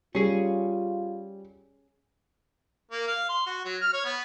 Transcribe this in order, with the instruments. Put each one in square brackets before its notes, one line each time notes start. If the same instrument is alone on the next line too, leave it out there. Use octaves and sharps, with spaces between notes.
[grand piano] G3 [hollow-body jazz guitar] C#4 G#4 [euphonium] F4
[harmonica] A#3
F5
C6
F#4
F#3
F6
C#5
B3